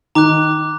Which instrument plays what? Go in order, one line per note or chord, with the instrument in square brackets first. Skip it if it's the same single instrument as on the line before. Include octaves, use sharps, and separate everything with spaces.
[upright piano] D#3 [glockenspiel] A#5 D6 F#6